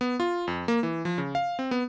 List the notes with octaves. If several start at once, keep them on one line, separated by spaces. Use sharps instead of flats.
B3
F4
F2
A#3
E3
F3
C#3
F5
C4
B3